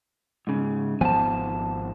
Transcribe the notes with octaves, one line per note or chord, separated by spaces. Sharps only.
G#2 C#3
G#1 F3 B3 G#5 A5